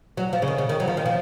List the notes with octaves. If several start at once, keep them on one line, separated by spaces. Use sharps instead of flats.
F#3
F3
C#3
D#3
C#3
D#3
F#3
F3
D#3
F3